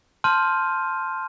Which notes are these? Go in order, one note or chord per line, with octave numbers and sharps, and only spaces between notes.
A5 C6 F6 G6 D#7